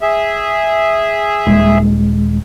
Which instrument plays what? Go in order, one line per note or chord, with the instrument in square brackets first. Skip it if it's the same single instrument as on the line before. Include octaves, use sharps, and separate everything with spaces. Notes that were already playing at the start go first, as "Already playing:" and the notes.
[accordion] G#4 E5
[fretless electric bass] D#1 [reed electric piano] G#3